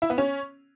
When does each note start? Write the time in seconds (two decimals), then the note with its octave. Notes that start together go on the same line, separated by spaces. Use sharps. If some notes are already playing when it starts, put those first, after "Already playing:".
0.02 E4
0.10 B3
0.18 C#4